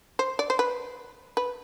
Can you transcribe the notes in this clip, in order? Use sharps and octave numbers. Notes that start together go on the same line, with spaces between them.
C5
D5
C5
B4
B4